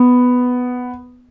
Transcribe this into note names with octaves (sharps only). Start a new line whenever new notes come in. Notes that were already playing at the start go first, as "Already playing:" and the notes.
Already playing: B3